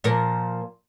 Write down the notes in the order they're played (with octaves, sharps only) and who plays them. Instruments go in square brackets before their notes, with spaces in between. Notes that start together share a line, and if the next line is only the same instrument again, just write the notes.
[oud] A#2 F3 A#4